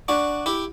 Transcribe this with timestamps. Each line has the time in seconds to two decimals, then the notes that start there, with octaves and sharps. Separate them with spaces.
0.08 D4 F#4
0.46 E4 G4